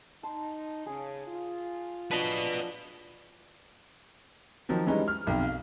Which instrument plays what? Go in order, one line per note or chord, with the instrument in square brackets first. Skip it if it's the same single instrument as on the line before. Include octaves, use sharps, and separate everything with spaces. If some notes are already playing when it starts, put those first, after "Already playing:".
[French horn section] D#4 [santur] A5 C6
[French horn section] C#3 [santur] G#4
[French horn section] F4
[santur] F3 F#3 D4 [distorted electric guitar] B4 D#5
[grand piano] D#3 F3 F#3
E3 G3 G#3 C#4 D#4
F6
B1 F2 G5
F5